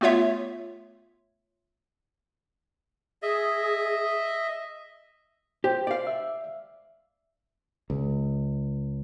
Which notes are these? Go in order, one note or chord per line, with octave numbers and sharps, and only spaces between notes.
A3 B3 F4 C#5 E5
G#4 D#5 E5
G4 C5
D5 F5
E5
C#2